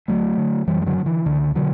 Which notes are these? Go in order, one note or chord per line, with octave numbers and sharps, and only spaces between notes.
D2 F#3 A3
D3
F#2 E3 G3
G3
D3 F#3
D3
E3
C#2 D3
B2 D3 F#3